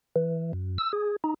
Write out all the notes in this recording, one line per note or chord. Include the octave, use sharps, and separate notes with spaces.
E3
F#2
E6
G#4
D#4